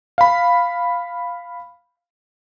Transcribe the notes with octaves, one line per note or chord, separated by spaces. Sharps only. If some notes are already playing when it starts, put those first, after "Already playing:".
F5 B5